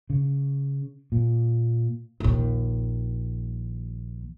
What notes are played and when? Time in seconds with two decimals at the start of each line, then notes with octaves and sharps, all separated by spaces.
0.10 C#3
1.12 A#2
2.20 A#1 D#2